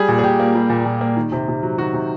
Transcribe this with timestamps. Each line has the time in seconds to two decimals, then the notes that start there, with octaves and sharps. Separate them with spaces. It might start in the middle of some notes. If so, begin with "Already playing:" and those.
Already playing: G3 G#4
0.08 A#2
0.19 G#4
0.23 A#2 G4
0.39 A#3
0.55 G3
0.69 A#2
0.85 A#2
1.01 A#3
1.17 D#3
1.32 C3
1.48 C3
1.63 F#3
1.78 D#3 F#4
1.93 C3